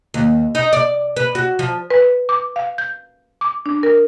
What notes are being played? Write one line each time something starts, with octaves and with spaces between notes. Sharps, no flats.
D#2
D#4
D5
B4
F#4
F3
B4
D6
F5
G6
D6
D4
A#4